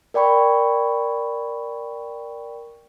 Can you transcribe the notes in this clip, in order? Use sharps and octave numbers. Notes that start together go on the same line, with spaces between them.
A#4 D5 G5 B5 C#6